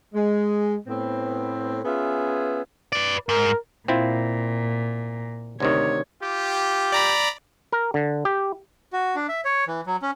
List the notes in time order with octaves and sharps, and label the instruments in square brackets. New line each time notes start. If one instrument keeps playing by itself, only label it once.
[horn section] G#3
A2 B3 C4
B3 C#4 F4 G#4 B4 E5
[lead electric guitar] B4 D5
[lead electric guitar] G#2 [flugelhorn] A#4
[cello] A#2 [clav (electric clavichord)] C4 E4 F4
[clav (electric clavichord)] D2 C3 D#3 [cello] C#5
[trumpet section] F4 G4
[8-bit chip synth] D5 A#5 B5
[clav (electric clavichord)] A#4
D3
G4
[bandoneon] F#4
D4
E5
C#5
E3
F#3
C#4